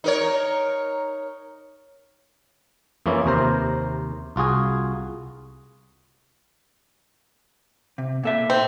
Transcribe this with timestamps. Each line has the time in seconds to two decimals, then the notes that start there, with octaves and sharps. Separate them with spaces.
0.04 D#4 A#4 C#5
3.06 F2 E3 A#3 C#4 E4
3.26 D#2 C3 A#4 C5
4.36 C2 F4 F#4 G#4 G#5
7.98 C3
8.23 A#2 A4 E5
8.50 C4